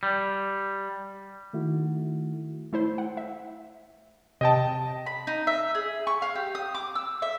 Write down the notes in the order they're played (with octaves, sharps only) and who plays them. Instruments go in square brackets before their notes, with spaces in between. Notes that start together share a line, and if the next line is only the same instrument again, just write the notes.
[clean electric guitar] G3
[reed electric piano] D#3 A3 E4 F#4
[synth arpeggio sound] A3 E4 C5
F#5
E5
[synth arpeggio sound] C3 G5 [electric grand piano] D#5 A5
[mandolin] B5
D#4
E5
G#4
C#6
F5
G4
D#6
D6
E6
E5